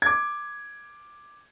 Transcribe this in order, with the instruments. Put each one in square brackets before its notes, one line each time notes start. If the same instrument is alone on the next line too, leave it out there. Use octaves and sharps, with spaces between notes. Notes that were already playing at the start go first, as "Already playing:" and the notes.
[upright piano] D6 G#6